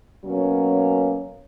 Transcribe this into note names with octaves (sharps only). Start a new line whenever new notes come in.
B2 F#3 A#3 C#4